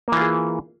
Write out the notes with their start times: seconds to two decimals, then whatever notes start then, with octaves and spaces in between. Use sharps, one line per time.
0.08 A#3
0.12 E3
0.17 F4
0.21 G#4